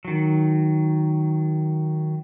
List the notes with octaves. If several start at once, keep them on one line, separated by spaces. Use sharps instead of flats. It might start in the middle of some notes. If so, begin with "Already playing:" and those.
D#3 F#3